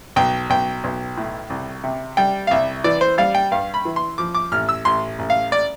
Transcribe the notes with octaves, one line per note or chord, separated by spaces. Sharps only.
B1 G5
B1 G5
B1
A2
C2
C3
G3 G5
F5
C2 E5
E3 D5
C5
G3 F5
G5
G2 F5
B5
E3
C6
F3 D6
D6
A1 F6
E6
A1 C6
A1
F5
D5